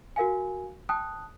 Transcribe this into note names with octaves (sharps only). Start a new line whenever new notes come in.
F#4 A#4 F5 G#5
G5 A5 D#6 F#6